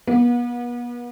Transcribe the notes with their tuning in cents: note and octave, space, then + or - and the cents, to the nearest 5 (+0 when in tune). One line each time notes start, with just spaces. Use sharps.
B3 -40